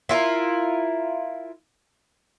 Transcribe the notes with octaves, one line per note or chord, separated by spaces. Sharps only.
E4 F4 A#4